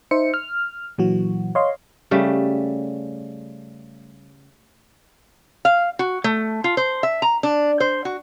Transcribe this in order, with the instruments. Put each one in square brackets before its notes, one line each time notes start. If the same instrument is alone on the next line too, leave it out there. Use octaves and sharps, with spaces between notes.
[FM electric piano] D#4 C5 E5 C#7
F6
A#2 E3 F#3 F#4
C#5 D#5 F5 C6
[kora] C#3 G3 A3
[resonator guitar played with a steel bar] F5
F#4
A3
F4
C5
E5
A#5
D4
C5
F#4